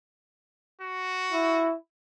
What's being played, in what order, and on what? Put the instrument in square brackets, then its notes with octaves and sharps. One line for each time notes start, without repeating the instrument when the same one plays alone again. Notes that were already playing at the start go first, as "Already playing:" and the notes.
[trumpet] F#4
[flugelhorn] E4